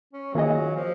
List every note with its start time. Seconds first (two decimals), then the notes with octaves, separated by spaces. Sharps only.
0.13 C#4
0.34 D#3 F#3 A#3 F4 G#4 D#5
0.76 F3